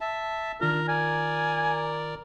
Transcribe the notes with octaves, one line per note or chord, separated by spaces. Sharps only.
E5 A5
D#3 D4 F4 A#4
A#4 D5 G#5